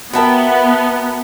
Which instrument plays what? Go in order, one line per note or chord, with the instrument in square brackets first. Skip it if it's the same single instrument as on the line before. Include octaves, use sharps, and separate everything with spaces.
[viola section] B3 [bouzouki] F#4 E5 G5 [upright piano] A#4 A5 B5